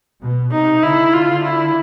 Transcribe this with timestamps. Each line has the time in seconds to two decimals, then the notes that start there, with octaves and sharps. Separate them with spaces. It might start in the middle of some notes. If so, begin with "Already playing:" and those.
0.21 B2
0.52 C3 D#4
0.83 D3 E4
1.13 F4
1.44 E4